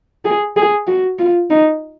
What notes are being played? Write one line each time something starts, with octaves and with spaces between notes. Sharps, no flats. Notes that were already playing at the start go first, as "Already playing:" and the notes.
G#4
G#4
F#4
F4
D#4